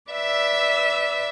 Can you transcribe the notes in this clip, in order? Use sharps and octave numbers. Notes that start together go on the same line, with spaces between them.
B4 D5 E5 E6